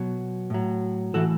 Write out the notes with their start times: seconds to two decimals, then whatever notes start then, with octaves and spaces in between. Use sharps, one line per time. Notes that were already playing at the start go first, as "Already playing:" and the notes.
Already playing: B2 F#3
0.50 A2 F#3
1.14 A2 E3 F#4 A4